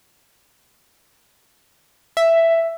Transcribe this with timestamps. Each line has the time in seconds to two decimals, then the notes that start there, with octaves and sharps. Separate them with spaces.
2.17 E5